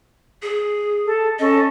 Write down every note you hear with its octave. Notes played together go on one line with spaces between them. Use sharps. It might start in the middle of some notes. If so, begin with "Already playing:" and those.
G#4
A4
C#4 A4 D#5